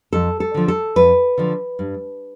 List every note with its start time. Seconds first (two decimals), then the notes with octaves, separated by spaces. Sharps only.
0.13 F2 A4
0.40 A4
0.54 D3 F3
0.68 A4
0.96 F2 B4
1.38 D3 F3
1.79 G2